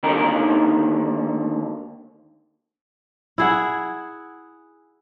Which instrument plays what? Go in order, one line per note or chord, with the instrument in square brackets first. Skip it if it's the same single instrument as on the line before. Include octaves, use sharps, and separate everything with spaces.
[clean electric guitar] D#2 D3 D#3 D#4 A#4
[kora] E4 G#4 F#5